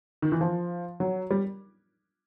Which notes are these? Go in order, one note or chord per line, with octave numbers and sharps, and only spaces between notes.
D#3
E3
F3
F#3
G3